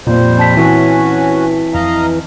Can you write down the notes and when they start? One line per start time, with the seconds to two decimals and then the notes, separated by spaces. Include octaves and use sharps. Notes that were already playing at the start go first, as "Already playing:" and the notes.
0.07 F2 A#2 G3 A#3 C5
0.37 C4 A5 B6
0.57 E3 C#4 F#4
1.74 F2 D#5 F5 A#5